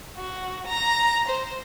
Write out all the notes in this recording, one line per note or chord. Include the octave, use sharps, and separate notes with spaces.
F#4
A#5
C5